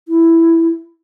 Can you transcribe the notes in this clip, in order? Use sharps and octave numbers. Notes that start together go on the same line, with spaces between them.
E4